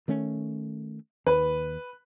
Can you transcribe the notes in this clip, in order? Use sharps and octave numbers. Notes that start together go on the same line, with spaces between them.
D#3 A3 C#4
D#2 B4